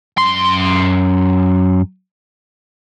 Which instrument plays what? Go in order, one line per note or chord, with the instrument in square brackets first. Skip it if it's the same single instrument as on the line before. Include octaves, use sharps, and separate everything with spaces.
[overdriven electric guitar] F#2 C6